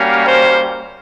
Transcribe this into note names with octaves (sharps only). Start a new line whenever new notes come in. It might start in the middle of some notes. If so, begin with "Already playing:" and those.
Already playing: G3 A#3 C#4 F#4
C5